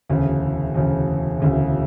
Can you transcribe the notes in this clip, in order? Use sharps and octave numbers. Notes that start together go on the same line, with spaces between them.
E1 D2 C#3
E1 D2 C#3
E1 D2 C#3